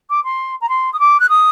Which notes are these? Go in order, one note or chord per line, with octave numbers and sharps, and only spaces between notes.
D6
C6
A#5
C6
D#6
D6
F#6
D#6